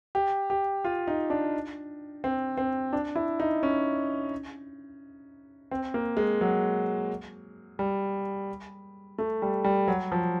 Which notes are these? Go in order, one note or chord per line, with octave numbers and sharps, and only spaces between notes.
G4
G4
F4
D#4
D4
C4
C4
D4
E4
D#4
C#4
C4
A#3
G#3
F#3
G3
A3
G3
G3
F#3
F3